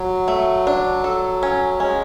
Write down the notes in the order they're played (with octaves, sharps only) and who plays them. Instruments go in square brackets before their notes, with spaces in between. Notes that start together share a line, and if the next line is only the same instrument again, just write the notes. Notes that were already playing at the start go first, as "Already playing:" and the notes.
Already playing: [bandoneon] F#3
[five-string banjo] A3
D4
A4
C#4
[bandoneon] G#3 [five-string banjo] C#4